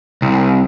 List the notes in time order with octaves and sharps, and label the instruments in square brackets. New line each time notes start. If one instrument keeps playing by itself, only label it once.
[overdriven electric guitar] C2